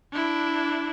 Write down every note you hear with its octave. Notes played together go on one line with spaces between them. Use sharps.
D4 E4